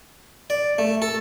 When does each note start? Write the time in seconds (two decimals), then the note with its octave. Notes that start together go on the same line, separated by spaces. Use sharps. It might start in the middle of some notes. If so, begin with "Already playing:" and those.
0.50 D5
0.78 A3
1.02 A4